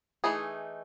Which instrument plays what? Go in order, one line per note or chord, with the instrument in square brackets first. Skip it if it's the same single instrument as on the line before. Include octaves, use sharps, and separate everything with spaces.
[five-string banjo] E3 A3 D#4 G#4